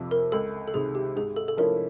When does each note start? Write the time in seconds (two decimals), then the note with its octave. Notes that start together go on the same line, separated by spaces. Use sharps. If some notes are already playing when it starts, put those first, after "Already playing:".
Already playing: F2 C3 F3
0.11 A#4
0.32 C#2 A4
0.67 A4
0.74 C3 D#3 G#4
0.95 G4
1.16 G#2 G#4
1.36 A4
1.48 A4
1.57 F3 A3 C#4 E4 A#4